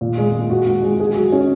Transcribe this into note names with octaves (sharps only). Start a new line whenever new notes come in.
A#2
G#3
G#3
F#4
F#4
G#3
G#4
F#3
C#4